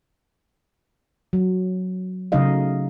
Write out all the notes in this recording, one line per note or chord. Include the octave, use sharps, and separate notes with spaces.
F#3
C#3 F#3 A3 D#4 D#5 F5